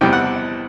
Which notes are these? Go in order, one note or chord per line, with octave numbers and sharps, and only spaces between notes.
E2 C3 E3 G3 G5
F#5